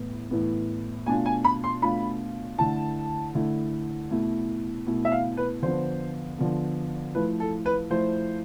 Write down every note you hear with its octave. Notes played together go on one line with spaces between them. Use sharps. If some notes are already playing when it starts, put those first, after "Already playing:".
Already playing: A2 E3 B3
A2 E3 B3
B2 A3 D4 F4 G#5
G#5
B5
C6
B2 A3 D4 F4 B5
D3 A3 E4 A5
D3 A3 E4
B2 A3 E4
B2 A3 E4
E5
F5
B4
D3 F3 B3 C5
D3 F3 B3
F3 A3 E4 B4
A4
B4
F3 A3 E4 C5